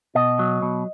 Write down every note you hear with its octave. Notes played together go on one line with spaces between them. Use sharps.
B2 D#5
F#3
B2